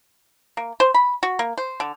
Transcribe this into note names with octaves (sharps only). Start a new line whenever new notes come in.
A#3
C5
B5
F#4
A#3
C5
D3